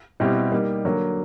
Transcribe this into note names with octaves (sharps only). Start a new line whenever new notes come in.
B2 G3 C4 E4 G4
G3 A#3 D#4
D3 F#3 A#3